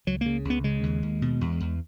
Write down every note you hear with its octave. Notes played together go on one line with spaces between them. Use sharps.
C#2 F#3
C#3 A#3
C#2
B3
C#3 G#3
D#2
D#2
B2
E2
E2